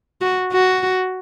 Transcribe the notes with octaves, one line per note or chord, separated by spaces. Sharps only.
F#4
F#4